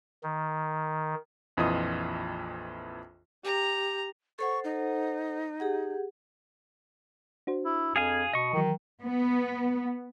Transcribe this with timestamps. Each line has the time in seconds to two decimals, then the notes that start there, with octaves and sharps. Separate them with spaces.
0.23 D#3
1.57 A#1 F2 E3 F4 D#5 D#6
3.44 G4 A#5
4.39 A4 C5 F#5 C#6
4.64 D#4
5.60 G4 G#4 F#5
7.47 D4 F#4 C5
7.65 E4
7.96 F2 G#4 F5 G#5
8.33 B2 D#5 C#6
8.53 D#3 E3 F#3
9.03 B3